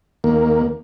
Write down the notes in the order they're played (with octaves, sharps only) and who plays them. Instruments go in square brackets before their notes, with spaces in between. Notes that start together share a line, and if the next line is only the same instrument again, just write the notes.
[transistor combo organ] D#2 A#3